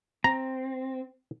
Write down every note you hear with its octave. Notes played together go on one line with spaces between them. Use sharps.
C4 A#5